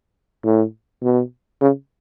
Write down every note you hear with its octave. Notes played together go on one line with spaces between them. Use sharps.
A2
B2
C#3